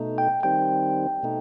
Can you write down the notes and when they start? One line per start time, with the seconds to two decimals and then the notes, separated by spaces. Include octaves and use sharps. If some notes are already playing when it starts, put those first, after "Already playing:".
Already playing: B2 A3 D#4
0.18 G5
0.43 D#3 G3 C4 G5
1.23 B2 A3 D#4